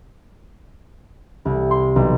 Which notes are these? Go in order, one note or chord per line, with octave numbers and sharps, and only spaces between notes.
C2
C6
B1